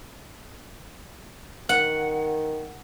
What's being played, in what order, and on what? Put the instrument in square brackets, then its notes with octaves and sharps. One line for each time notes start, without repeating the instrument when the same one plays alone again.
[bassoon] D#3 [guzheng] F#5